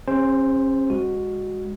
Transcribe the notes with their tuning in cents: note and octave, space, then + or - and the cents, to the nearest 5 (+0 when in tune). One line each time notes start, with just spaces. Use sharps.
C#4 -40 G#4 -45 C5 +0
G#3 -30 F#4 +0